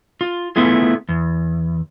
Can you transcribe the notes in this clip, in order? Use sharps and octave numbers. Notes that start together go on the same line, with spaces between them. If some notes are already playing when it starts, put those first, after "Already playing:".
F4
A3 B3 E4 F4 G#4
E2